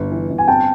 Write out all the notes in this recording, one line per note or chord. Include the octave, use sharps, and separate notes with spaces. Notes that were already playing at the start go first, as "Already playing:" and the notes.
Already playing: G1
E3
G1
G#5
C4 G5 A5